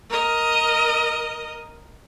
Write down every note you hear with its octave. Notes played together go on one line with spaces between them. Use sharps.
A#4 D#5